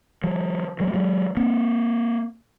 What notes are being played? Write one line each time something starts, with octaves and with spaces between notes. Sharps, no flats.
F3 G3
F#3 G#3
A3
F#3 G#3
A#3 C4